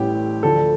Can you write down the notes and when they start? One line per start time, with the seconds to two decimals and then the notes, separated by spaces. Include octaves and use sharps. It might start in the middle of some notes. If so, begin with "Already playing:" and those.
Already playing: A1 A2 E3 G3 G4
0.43 D2 D3 F3 A4